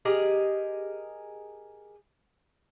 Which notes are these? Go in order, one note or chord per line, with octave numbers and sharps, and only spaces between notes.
G4 G#4 A#4 D#5